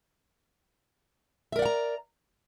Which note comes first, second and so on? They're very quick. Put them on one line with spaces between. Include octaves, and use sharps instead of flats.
E5 A#4 D5 F#5 A#5